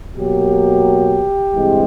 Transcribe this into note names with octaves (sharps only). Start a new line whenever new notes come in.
B2 F#3 A#3 G4
G2 E3 G#3 C4